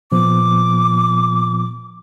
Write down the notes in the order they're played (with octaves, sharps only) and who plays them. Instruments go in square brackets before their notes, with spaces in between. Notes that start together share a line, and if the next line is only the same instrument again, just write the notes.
[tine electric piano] A#2 F3 B3 [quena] D6